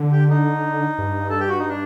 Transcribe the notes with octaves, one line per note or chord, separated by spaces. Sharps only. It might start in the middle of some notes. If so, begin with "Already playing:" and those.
Already playing: D3
G4
D#4
G2
A4
G4
F#4
D#4
D4